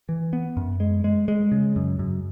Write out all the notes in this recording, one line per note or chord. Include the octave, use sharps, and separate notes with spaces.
E3
B3
F#2
G#3
G#3
G#3
C#3
F#2
F#2